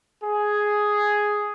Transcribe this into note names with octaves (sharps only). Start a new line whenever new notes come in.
G#4